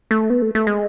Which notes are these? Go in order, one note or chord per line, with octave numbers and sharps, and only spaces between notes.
A3
B3
A3
A3
G#3